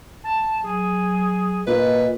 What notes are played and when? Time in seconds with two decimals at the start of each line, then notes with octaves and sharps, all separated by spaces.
0.24 A5
0.63 F#3 G#4
1.67 A#2 B4 D#5